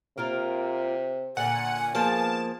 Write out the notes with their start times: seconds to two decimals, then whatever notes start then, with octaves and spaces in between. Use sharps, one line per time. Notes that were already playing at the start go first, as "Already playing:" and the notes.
0.18 C3 A#3 F4 A#4
1.37 A#2 D3 F#5 G#5
1.95 F3 A#3 B3 G#4 A5